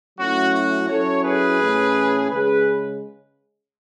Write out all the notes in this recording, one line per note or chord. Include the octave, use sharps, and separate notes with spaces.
F#3 A3 C#4 E4 F#4
F#4
F#3 C#4 E4 A4 C#5
G#4 B4
A2 E3 A3 C#4
C#3 G#3 C#4 G#4 B4